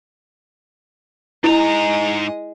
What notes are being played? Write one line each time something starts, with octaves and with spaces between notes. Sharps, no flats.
G#2 G#3 E4 D#5 A#5